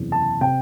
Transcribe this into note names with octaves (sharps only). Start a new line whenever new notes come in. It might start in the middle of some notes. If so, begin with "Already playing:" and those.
Already playing: F#1 E2 C3
A5
C3 G5